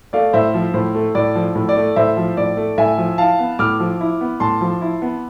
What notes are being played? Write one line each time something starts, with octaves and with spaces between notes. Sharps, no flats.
A3 D5 F5
A2 C5 E5
F3
A2 C5
A3
A2 D5
F3
A2
D5
A3
A2 C5 E5
F3
A2 D5
A3
A2 E5 G#5
F3
E4 F5 A5
B3
A2 D6 F6
F3
E4
B3
A2 A5 C6
F3
E4
B3